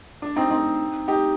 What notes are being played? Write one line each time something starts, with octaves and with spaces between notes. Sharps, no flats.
D4
C4 D#4
C4 D#4
D#4 G4